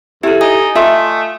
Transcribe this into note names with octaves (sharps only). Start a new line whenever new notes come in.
E2 E4 G4 A4
D#4 D#5 G#5 D#6
A3 F4 E5